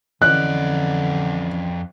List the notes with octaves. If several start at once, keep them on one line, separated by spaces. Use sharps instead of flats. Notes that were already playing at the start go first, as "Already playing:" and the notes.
F2 D3 E3 C#4 D5 D#5 F#6